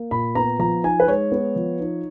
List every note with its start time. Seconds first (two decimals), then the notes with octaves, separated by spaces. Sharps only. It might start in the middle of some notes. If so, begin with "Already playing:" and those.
Already playing: A#3
0.11 A#2 B5
0.35 B3 A#5
0.59 F3 A#5
0.83 D#4 G#5
1.00 B4
1.08 G#3 C#5
1.32 B3
1.56 F3
1.80 D#4